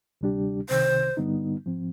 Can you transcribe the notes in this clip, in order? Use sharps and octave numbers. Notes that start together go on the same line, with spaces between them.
D2 C3 G3 D4 G4
C2 C3 D#3 C5
G2 D3 G3 B3 D#4
G#2 F3 C4